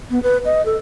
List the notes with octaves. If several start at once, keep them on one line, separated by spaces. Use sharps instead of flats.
B3
B4
D#5
A4